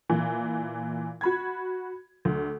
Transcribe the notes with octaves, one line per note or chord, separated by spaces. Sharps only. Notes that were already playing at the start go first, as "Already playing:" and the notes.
A#2 E3
F#4 B5 G#6
D2